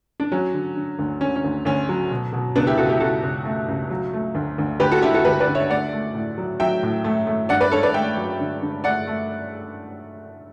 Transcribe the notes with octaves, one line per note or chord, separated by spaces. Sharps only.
D4
F#3 C#4
D3
D3
D2
D3 C#4
C#4
D2
D2 C#4
F#3
B2
B2
C#2 B3 D4
E4 G4
C#2 F#4 A4
E4 G4
C#2 F#4 A4
C#2
A3
C#2
F#3
A3
D2
D2
D2 G4 B4
F#4 A4
D3 E4 G4
F#4 A4
D2 G4 B4
B4 D5
D3
C#5 E5
A3 D5 F#5
A3
A2
F#3
F#3 E5 G5
A2
A3
A3
G2 D5 F#5
B4 D5
G2 A4 C#5
B4 D5
A3 E5 G5
F#3
D3
D3
A3 D5 F#5
A3